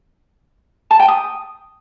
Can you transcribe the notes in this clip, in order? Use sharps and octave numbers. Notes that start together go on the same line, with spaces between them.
A5
G5
D#6